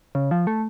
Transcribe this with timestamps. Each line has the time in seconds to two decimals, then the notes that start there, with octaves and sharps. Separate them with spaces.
0.15 C#3
0.31 F3
0.47 A3